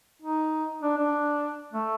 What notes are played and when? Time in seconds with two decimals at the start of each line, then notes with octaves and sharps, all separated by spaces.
0.22 D#4
0.82 D4
0.98 D4
1.73 A3